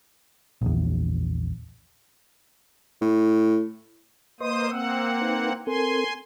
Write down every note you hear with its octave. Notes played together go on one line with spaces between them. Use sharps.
A#1 E2
A2
A#3 B4 C5 D#5 C6 D#6
A#3 C4 F#5 E6
D#4 B4
C4 A4 A#4 G#5 C6